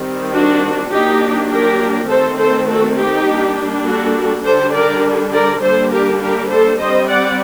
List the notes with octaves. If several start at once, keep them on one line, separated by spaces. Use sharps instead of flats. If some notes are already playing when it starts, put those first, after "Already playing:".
Already playing: D#3 G3 C4
D4 F#4
F#3 A#3 D4 D#4 G4
G4 A#4
D#3 A3 C4 A4 C5
A4 C5
F#4 A4
D#4 G4
G3 A#3 D4
F#4 A4
D3 G3 D4 A4 C5
A#4 D5
A#4 D5
D3 G3 A#3 D4 A4 C5
G4 A#4
G4 A#4
A4 C5
G3 C4 C5 D#5
D5 F#5